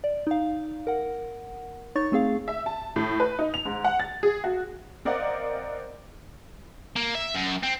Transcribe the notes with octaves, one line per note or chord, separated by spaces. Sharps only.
D5
D#4 F5
A#4 F#5
D#4 C#5 C#6 A6
A3 C4 G#4 F5
E5
A5
A2
B4
D#4
F7
G#2
F#5
A6
G#4
F#4
C4 A#4 D5 D#5 F5 F#5
A#3
E5
F#2
C4